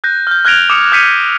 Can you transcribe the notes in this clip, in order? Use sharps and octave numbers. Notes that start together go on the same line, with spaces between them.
F#6 G6 A#6
F6 G6
F6 F#6 G#6 A#6 D7 F7
D6 D#6 C#7
D#6 F#6 G6 B6 C#7 D#7